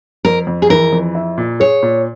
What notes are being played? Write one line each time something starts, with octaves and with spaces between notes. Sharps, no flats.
F2 A#4
F2
G#4
E3 A#4
F2
E4
A#2
G#4 C#5
A#2